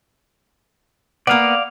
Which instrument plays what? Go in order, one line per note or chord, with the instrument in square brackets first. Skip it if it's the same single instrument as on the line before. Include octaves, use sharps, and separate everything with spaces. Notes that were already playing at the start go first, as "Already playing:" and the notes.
[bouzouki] A#3 B3 [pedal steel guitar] D5 F5